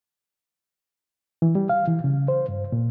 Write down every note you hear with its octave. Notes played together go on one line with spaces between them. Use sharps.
E3
G3
F5
E3
C#3
C5
G2
A#2